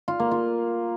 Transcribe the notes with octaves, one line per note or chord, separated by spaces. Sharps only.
F4
A#3
F4